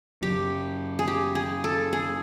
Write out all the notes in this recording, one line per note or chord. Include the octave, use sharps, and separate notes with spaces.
F#2 C#3 F#3 G4
G#4
G4
G#4
A4
G#4